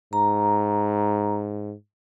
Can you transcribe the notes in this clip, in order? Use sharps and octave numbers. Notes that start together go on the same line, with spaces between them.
G#2 A#5